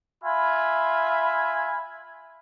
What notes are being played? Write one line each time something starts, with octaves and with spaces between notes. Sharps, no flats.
F4 E5 G#5 B5